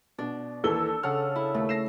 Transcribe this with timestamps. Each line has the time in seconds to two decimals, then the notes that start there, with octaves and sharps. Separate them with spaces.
0.18 B2 D4
0.64 D#2 E3 A4 G7
1.03 C#3 F#5 F6
1.36 E4
1.54 D#2 A3
1.69 A#6 C7 E7